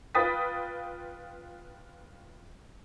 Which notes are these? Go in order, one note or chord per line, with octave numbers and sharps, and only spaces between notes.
F4 B4 G5 D#6 A6 B6